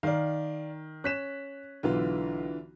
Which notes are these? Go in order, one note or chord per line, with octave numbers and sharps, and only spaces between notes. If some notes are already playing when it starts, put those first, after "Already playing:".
D#3 D5 F5
C#4 F#6 B6 E7
B1 D3 E3 F4